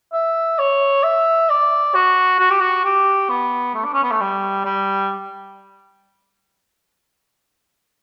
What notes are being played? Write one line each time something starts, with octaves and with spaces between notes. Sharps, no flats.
E5
C#5
E5
D5
F#4
F#4
G4
F#4
G4
B3
A3
D4
C#4
B3
A3
G3
G3